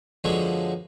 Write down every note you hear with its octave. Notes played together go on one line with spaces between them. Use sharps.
F#2 D3 F3 F#3 G#3 B3